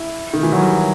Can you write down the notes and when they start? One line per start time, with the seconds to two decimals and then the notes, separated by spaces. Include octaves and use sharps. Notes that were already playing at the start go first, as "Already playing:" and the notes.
Already playing: E4
0.33 D#3
0.43 E3
0.52 F#3
0.62 G3